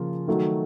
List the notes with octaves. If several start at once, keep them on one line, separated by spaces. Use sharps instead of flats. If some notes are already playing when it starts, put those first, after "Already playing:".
Already playing: C#3 F3 A#3 F4
D#3 F#3 A3